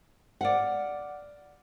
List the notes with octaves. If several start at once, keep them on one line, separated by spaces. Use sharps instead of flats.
D5 F5 F#5